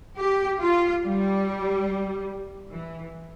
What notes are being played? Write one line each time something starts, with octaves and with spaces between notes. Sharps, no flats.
G4
F4
G3
E3